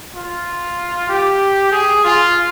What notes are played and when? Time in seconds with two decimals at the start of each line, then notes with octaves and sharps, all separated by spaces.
0.14 F4
1.09 G4
1.72 G#4
2.04 F4